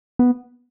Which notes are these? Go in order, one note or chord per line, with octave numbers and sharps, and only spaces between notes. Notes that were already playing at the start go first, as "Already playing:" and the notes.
B3